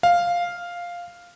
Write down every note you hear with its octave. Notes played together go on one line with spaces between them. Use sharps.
F5